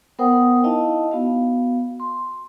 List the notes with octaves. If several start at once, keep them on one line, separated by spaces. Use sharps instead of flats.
B3 A#4 C5 F#5 G5 D#6
D#4 E4 D#5 F5 A5
B3 F#4 F5
C6